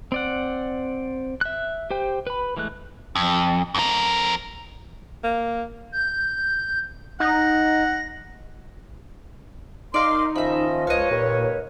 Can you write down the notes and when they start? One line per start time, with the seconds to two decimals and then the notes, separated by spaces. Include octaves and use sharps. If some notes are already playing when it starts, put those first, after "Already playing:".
0.12 C4 D5 F#5
1.41 E5 F#6
1.90 G4 C5 G5
2.27 B4 B5
2.57 E3 G#3 A3 F#6
3.16 F2
3.75 F2 A#4
5.23 A#3
5.92 G6
7.20 D#4 F#5 A#6
9.94 D#4 A#4 D5 D#5 F5 C6
10.36 D#3 F3 C#4 D#5 E5 B5
10.87 C#2 B4 C#5 D#5 F5
11.10 D#2 A#2